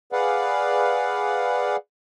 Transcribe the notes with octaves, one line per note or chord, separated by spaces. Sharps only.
G#4 B4 D5 F5 F#5